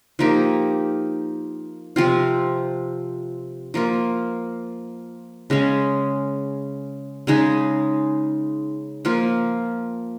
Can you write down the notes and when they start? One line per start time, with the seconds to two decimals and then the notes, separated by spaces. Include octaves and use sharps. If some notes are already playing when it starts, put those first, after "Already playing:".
0.19 F3 A#3 D#4 G4
1.96 C3 F3 C4 F4
3.74 F3 A#3 F4
5.50 C#3 G#3 C#4
7.27 C#3 G#3 D#4 G#4
9.05 F3 A#3 F4